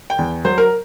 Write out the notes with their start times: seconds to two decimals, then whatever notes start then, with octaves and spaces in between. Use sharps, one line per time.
0.10 G5
0.18 E2
0.44 F#3 C5
0.58 A#4